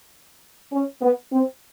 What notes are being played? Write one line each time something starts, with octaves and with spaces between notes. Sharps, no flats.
C#4
B3
C4